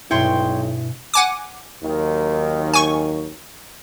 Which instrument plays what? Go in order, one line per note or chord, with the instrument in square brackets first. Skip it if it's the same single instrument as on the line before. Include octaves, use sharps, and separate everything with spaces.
[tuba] B1 [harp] G2 B2 G#3 [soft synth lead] E4 [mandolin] C#5 G5 C6
[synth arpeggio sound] F#5 G#5 D6
[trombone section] D#2 D#3 F#3
[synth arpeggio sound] G#5 C#6